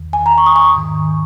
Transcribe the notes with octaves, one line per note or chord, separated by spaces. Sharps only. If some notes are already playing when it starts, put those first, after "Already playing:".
Already playing: E2 D#3
G#5
A#5
C#6
D#6
C#6
G#2 D#3